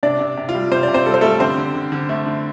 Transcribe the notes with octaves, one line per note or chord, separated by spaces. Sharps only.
C3 D4 D5
C3
C3
F4
G3
C3 C5
D5
C3
C4 C5
G3 A4
C5
G3 A3 A4
D3 C4 C5
D3
D3
D3
A3
D3